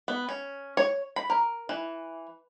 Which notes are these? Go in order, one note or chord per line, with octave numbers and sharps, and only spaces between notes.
B3
C#4
C#5
B5
A#4
E3